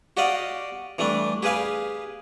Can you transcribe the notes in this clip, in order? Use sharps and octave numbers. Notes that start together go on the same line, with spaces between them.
F#4 G4 D5 D#5 F5
E3 G3 A3 D4
G4 G#4 B4 F5 G#5